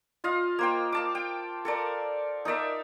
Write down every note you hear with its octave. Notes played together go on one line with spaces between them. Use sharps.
F4 D#5 F5
A#3 C5 G5
F5 A5 D6
G5
A4 A#4 D5
D#4 A#4 D5 E5